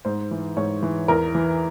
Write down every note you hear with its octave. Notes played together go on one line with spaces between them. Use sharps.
G#2 C5
E3
G#2 C#5
E3
E2 A#4
E3